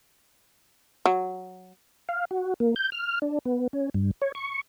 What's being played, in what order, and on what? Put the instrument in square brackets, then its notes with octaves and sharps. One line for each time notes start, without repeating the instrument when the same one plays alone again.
[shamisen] F#3
[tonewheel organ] F5
F#4
A#3
G6
F6
D4
B3
C#4
G2
C#5
C#6